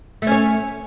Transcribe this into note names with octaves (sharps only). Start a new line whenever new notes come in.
A3 C#4 C#5